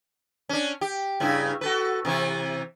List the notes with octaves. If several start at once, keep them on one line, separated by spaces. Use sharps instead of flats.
C#4 D4
G4
G2 C#3 E4
F#4 A4 B4
C3 E3 E4